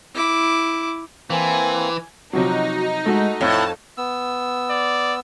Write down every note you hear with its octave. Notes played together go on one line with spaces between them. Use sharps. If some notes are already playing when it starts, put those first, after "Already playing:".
E4 D6
E3 A#3 C4 G#5
C3 F3 F#3 D#4 F#4
G#3 A3 F#4
F2 A2 C#5 A5
B3 E6
D5